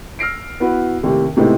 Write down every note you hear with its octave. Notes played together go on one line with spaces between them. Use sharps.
E6 F6 A#6 C7 D7
B3 E4 F#4 B4
D#2 A2 C3 G4
A2 C3 G#3 B3 D#4 E4